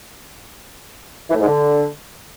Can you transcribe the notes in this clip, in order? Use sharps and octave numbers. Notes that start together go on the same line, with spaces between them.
E3
A2
G#2
D3